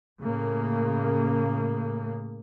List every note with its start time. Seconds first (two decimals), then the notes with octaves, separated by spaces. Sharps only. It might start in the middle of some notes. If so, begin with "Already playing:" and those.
0.19 A2 C#3 A#3